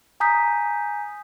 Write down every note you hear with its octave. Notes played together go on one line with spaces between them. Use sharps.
G#5 A#5 D#6 G6 B6